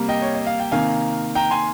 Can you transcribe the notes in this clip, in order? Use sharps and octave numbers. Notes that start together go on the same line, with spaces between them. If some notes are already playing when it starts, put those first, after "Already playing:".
Already playing: C3 G3 A#3
D#5 G5
C#5
D#5
F5
G5
C3 D#3 A#3 F5 G#5
G5 A#5
G#5 C6